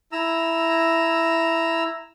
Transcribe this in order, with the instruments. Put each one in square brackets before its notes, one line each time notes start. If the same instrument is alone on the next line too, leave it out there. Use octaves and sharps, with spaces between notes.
[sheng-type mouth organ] E4 A#5 E6